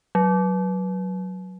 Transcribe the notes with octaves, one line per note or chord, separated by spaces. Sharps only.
F#3